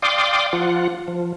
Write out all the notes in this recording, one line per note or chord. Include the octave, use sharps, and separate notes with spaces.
D5 F5 G5 C6 D6 D#6
F3 F4 F#5
F3